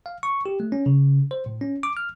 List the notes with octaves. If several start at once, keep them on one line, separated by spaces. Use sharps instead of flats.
F5
C#6
G4
A3
C#4
C#3
C5
A2
C#4
D6
F6